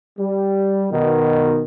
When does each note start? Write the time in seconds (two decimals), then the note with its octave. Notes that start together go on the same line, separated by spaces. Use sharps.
0.19 G3
0.92 B2 D#3